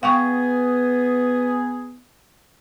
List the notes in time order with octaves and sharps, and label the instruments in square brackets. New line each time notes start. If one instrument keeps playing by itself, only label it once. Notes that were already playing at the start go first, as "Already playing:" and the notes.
[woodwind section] B3 G#4 [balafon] F5 G5 C#6